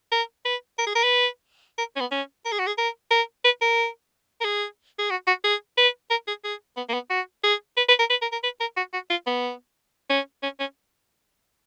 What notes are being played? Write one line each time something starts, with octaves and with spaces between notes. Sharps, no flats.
A#4
B4
A#4
G#4
A#4
B4
A#4
C#4
B3
C#4
A#4
G#4
F#4
G#4
A#4
A#4
B4
A#4
A#4
G#4
G#4
F#4
F#4
G#4
B4
A#4
G#4
G#4
B3
A#3
B3
F#4
G#4
B4
B4
A#4
B4
A#4
A#4
B4
A#4
F#4
F#4
F4
B3
C#4
C#4
C#4